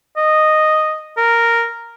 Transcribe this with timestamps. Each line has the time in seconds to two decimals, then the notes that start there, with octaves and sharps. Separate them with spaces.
0.17 D#5
1.17 A#4